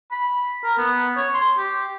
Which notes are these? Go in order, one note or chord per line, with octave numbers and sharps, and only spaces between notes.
B5
A#4
B3
C#5
C6
G4